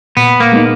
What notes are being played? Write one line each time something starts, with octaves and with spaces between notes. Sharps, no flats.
A#2 B3
A#3
G#3 B3 D#4